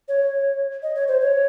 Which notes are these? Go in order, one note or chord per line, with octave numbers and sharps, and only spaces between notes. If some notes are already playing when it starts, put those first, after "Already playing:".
C#5
D#5
C#5
C5
C#5